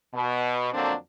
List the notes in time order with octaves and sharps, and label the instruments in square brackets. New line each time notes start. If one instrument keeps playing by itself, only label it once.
[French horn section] B2
F2 D3 F#3 A#3 C4 D4